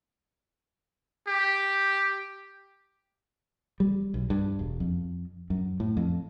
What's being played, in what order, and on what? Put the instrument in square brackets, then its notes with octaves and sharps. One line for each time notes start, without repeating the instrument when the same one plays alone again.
[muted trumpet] G4
[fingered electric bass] G3
B1
G2
E1
F2
F#2
A2
F2